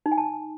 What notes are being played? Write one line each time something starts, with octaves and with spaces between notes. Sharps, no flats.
D#4
G#5
A5